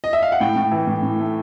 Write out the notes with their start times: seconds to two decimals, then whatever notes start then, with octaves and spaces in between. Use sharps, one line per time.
0.04 D#5
0.13 E5
0.23 F5
0.32 F#5
0.41 A2 G5
0.56 A2
0.72 E3
0.87 A2
1.03 A2
1.19 A3